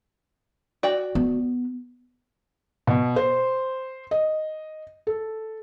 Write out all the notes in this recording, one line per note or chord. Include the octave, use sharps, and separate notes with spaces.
F#4 D5 G5
B3
B2
C5
D#5
A4